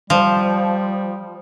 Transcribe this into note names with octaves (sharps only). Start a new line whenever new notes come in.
F3 G3